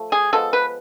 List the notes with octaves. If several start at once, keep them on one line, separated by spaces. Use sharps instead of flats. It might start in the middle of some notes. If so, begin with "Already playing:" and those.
Already playing: F3 A3
G#4
F3 G#3 B3 A4
B4